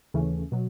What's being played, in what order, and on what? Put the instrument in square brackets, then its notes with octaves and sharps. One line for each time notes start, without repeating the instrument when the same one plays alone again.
[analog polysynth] D#2 C#3 E3 A3 C#4
B2 F#3